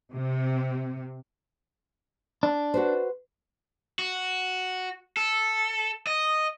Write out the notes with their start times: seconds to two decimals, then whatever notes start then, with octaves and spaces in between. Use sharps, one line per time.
0.13 C3
2.43 D4
2.74 F#4 B4 C5
3.99 F#4
5.17 A4
6.07 D#5